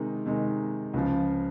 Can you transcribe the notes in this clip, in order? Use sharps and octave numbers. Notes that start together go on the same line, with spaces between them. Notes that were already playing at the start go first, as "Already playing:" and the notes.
Already playing: C3 D#3 G#3 D#4
C3 D#3 G#3 D#4
C#2 C#3 F3